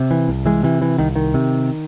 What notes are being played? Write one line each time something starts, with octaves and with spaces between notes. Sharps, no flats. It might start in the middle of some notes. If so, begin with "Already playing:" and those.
Already playing: C3
E3
C2
E3 G#3
C3 E3
E3
C2 D#3
D#3
C3